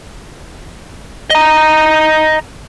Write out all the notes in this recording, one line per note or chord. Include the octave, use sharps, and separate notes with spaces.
D#5 A#5